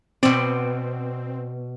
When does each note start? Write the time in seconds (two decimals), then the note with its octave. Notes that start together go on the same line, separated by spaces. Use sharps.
0.23 B2 C4 D5